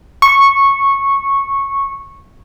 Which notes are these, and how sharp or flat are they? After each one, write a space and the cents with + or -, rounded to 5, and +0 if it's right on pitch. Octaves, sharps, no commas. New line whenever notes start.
C#6 -10